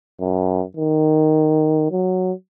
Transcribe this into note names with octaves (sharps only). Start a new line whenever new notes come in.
F#2
D#3
F#3